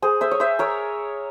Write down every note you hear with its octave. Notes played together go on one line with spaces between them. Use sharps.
G#4 C5
C5 E5
C#5
C5 E5
A#4 C#5